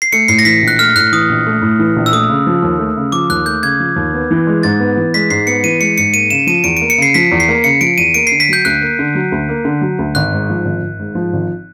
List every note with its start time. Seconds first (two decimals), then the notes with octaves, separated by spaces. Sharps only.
0.02 C7
0.13 A3 C#7
0.28 A2 C7
0.39 A#6
0.45 E3 B6
0.62 A#1
0.68 F#6
0.79 A3 F6
0.95 A2 F#6
1.12 E3 D#6
1.29 A#1
1.46 A3
1.62 A2
1.79 E3
1.96 A#1
2.06 E6
2.12 A3 D#6
2.29 C#3
2.47 F3
2.62 D#2
2.79 A3
2.97 C#3
3.12 F3 D6
3.30 D#2 F#6
3.46 A3 G6
3.63 C#3 G#6
3.80 F3
3.96 D#2
4.14 B3
4.31 E3
4.47 G#3
4.63 G#2 A6
4.80 B3
4.97 E3
5.14 G#3 B6
5.30 G#2 C7
5.47 B3 C#7
5.64 E3 D#7
5.80 G#3 C#7
5.98 G#2 C#7
6.14 A#3 D#7
6.31 C#3 E7
6.47 F3 D#7
6.64 E2 D7
6.77 D7
6.81 A#3
6.90 C#7
6.98 C#3 C7
7.14 F3 B6
7.32 E2
7.40 C7
7.48 A#3
7.64 C#3 C#7
7.81 F3 D7
7.98 E2 D#7
8.14 A#3 D7
8.27 C7
8.31 D3
8.40 B6
8.49 F#3 G6
8.65 D2 F#6
8.82 A#3
8.99 D3
9.15 F#3
9.32 D2
9.49 A#3
9.65 D3
9.81 F#3
9.99 D2
10.15 G#1 F#6
10.32 G#2
10.49 F3
10.65 G#1
10.82 G#1
10.99 G#2
11.15 F3
11.33 G#1